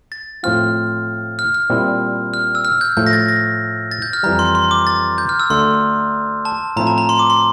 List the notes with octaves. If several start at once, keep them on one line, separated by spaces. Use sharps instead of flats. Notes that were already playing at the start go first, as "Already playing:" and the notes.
A6
A2 F3 C4 F4 F6
F6
F6
A#2 G3 C4 E4
F6
E6
F6
G6
A2 F3 A3 G6
A#6
A6
A#6
A6
G6
F6
F2 E3 G3 A#5
C6
C6
D6
A6
G6
F6
E6
D2 D3 A3 C6
A5
A2 F3 C4 E4 A#5
A5
A#5
C6
D6
C6